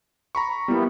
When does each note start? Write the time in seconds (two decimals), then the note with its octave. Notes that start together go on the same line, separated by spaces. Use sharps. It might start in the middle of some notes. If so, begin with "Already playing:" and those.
0.35 A#5 B5 C#6
0.68 G3 A#3 B3 E4 G4